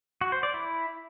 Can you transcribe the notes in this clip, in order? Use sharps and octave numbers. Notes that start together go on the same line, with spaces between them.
F#4
C5
D5
E4